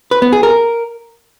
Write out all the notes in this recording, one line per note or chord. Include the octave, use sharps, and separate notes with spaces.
B4
B3
G#4
A#4